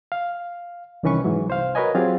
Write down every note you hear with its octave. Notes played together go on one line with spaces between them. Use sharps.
F5
C2 D#3 E3 C#4 B4 C#6
G#2 E3 F#3
C2 C5 F5
F#4 A#4 B4 C#5 D#5 G#5
F#3 C4 F4 G4 G#4 F5